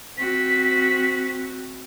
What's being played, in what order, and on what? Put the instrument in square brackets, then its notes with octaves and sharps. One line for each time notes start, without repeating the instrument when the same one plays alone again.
[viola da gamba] C4 F#4 [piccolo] B6